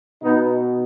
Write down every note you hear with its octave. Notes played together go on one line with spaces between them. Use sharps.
B2 B3 D#4